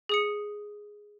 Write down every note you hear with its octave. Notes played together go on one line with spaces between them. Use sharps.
G#4 D#6 C#7